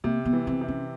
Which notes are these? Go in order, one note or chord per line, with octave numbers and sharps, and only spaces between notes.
C3 A#3
B3
E3
C4
C3
C#4